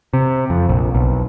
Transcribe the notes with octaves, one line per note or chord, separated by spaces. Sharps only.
C3
F2
A#1
B1